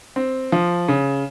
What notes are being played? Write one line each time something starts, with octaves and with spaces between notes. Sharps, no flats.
C4
F3
C#3